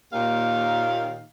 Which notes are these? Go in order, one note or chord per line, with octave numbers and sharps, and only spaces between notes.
D#2 A#2 D#3 F5